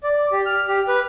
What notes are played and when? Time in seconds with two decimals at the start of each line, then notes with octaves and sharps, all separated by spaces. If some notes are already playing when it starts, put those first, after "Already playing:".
0.03 D5
0.32 G4
0.46 F6
0.68 G4
0.88 B4